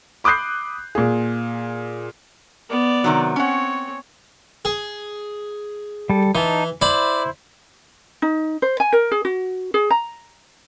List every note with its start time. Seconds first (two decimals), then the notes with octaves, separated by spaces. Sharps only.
0.24 B5 D6 D#6 F#6 G6 C7
0.95 A#2 G#4
2.70 B3 D5
3.04 C3 D#3 F#3
3.36 C4 C#4 C#5 F#5
4.65 G#4
6.09 G3 A4
6.35 E3 D#4 A5
6.81 E4 C5 D5 B5
8.22 D#4
8.62 C5
8.80 G#5
8.93 A#4
9.11 G#4
9.25 F#4
9.74 G#4
9.90 A#5